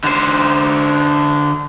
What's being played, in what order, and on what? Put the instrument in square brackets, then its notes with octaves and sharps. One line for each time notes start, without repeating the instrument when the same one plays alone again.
[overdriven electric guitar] D3 C5